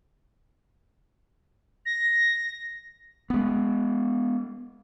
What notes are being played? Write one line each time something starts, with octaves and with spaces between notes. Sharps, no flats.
A#6
G#3 B3